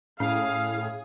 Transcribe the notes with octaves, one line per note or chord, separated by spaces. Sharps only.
A2 C#4 G#4 F5